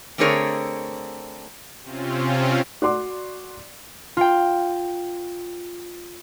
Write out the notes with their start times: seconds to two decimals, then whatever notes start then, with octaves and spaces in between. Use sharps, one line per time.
0.18 D3 A3 C4 G#4 A#4 C#5
1.82 C3 C4 C#4 F4
2.82 F#4 D5 C6 D6
4.17 F4 G5